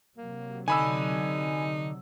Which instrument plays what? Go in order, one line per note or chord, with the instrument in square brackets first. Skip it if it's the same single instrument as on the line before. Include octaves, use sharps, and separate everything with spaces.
[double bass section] C3 F#3 [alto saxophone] A#3
[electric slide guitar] D3 D4 [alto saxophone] D#4 [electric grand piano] G#5 B5 E6